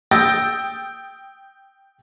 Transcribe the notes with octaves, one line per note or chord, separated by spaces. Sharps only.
G5 D#6 E6 G6 A6 A#6